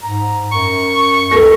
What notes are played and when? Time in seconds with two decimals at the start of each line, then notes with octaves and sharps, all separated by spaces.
0.02 G#2 A#5
0.52 F#2 C#6
1.31 C#2 A4 A#4 A#6